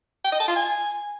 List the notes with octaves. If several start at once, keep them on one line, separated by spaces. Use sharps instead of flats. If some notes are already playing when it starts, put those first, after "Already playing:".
G5
D#5
A5
F4
G#5